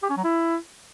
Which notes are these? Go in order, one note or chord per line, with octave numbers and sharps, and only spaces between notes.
G4
C#4
F#3
E4